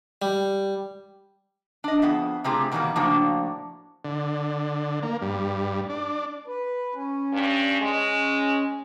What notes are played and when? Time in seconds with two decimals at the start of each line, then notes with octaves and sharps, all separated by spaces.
0.22 G3
1.84 D4 D#5
2.02 F2 B3 G#4 E5
2.44 C3 A3 C4 F4 G4 G#4
2.72 B2 D#3 E3 F#3 G3 A#3
2.96 A2 C#3 F3 A#3 D4 F#4
4.05 D3
5.03 A#3
5.22 G2
5.90 D4
6.47 B4
6.94 C#4
7.32 G2
7.81 G#3